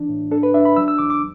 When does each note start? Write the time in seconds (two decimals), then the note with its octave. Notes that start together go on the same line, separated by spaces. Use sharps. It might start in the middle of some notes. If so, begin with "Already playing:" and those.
Already playing: E3 D4
0.09 A2
0.31 D4 A4
0.43 B4
0.54 D4 E5
0.65 B5
0.76 F#3 E6
0.88 E6
0.98 E2 D6
1.10 D6